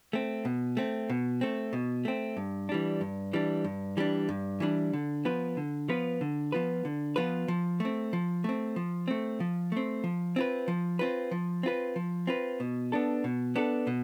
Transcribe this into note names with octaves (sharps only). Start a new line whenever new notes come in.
A3 C4
B2
A3 C4
B2
A3 C4
B2
A3 C4
G2
E3 G3 D4
G2
E3 G3 D4
G2
E3 G3 D4
G2
E3 G3 D4
D3
F3 B3 F4 B4
D3
F3 B3 F4 B4
D3
F3 B3 F4 B4
D3
F3 B3 F4 B4
F3
A3 C4
F3
A3 C4
F3
A3 C4
F3
A3 C4
F3
C4 F4 B4
F3
C4 F4 B4
F3
C4 F4 B4
F3
C4 F4 B4
B2
B3 D4 A4
B2
B3 D4 A4
B2